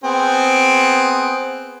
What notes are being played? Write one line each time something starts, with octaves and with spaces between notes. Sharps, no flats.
B3 C4 G#4